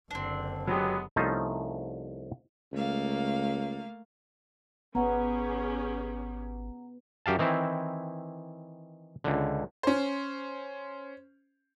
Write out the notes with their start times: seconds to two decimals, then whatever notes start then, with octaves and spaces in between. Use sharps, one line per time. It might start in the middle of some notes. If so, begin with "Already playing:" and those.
0.11 F#1 D3 C4 D4
0.67 F#3 G#3 B3 G4
1.16 C2 F3 A3 C#4 D#4 C5
2.73 C#2 A3 A#3 F5
4.95 G#1 B3 C#4 G4 G#4 B4 F#5 A#5
7.26 F#2 G4 F5 A5
7.39 D#3 E3 C4 E4
9.24 C#2 D3
9.83 C#4 C5